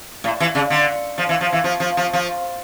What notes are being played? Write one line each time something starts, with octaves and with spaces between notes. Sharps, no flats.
A2
E3
C#3
D3
F3
E3
F3
E3
F3
F3
F3
F3